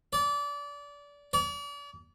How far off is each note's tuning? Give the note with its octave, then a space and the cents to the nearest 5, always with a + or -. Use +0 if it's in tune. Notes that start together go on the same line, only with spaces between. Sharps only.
D5 -25
D5 -40